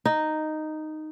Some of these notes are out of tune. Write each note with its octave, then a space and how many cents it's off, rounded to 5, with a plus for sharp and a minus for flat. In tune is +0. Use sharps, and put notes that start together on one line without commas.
D#4 -5